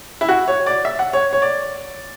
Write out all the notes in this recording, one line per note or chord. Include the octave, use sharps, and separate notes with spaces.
E4
F#4
C#5
D5
E5
F#5
C#5
C#5
D5